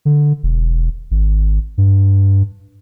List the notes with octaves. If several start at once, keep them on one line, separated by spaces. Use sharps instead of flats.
D3
E1
G#1
G2